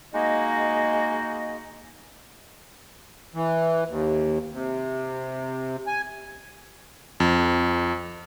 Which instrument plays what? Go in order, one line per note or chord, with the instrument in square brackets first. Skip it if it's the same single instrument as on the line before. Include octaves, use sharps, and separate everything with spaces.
[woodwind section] G#3 A#3 D#4 F#4 D#5
[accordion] E3
D#2
C3
G#5
[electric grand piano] F2